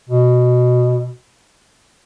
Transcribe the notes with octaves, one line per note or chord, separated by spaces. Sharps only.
B2